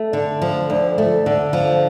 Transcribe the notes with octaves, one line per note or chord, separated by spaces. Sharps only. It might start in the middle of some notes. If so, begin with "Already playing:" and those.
Already playing: A3
D3
F3
D2
A3
D3
F3